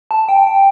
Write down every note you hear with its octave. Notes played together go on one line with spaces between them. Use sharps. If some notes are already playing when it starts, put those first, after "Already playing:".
A5
G5
G5